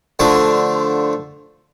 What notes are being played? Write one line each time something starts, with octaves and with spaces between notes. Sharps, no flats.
D3 F3 A3 A5